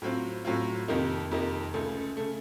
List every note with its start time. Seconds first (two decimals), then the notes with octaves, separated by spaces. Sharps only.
0.02 A2 F#3 C4 F4
0.45 A2 F#3 C4 F4
0.88 F2 C3 D#3 A#3 D#4
1.31 F2 C3 D#3 A#3 D#4
1.74 C#2 C#3 A3
2.17 C#3 A3